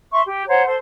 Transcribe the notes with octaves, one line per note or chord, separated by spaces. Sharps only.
E5 C6 C#6
G4
C5 C#5 F#5 A#5
A4 C5 C6